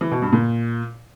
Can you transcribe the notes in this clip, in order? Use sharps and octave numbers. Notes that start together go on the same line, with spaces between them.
E3
B2
G2
A#2